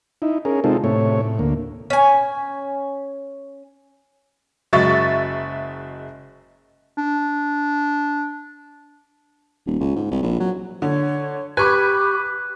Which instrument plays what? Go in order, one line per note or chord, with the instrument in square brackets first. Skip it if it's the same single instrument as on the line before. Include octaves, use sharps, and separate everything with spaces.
[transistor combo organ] D#4 E4
C#4 G#4 A#4
C3 G#3 C4 D#4 F4 A4
A2 C3 A3 C#5
A2
D2 A#3
[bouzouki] C#4 G#5
[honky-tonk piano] F#1 F#3 G#3 E5 C#6 A6
[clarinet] D4
[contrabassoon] D#1
C#2
G#2
C2
A#1
F#3
[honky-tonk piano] D3 [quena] C#5
[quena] G4 [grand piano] B4 [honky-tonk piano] B5 C#6 G#6 [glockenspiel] F#6